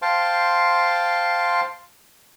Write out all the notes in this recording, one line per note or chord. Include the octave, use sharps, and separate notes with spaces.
C5 F5 G5 A5 C6